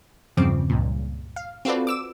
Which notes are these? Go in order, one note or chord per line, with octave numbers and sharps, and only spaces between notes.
E2 G2 C#3 F3 C4 D6
C#2 G2 A#2
F5
C4 F4 F#4 A4 B4 D5
D6 E6 E7